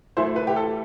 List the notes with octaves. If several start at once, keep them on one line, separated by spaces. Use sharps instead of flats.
E3 A3 E4 C5
B4
G4
A4